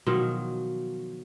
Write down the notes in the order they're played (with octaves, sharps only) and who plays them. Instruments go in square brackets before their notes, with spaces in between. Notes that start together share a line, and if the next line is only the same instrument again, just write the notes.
[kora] B2 D#3 F3 F#3